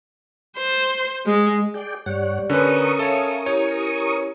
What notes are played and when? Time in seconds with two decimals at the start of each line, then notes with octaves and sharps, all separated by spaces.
0.58 C5
1.26 G#3
1.74 G#4 D5 G5
2.06 G2 G4 C#5 D5 F#5
2.50 D3 C#4 A#4 B4 C#6 D#6
2.99 A4 C#5 E5 F5
3.46 E4 G4 C#5